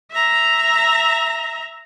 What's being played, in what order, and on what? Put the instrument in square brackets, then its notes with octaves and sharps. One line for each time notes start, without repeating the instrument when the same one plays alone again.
[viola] E5 A#5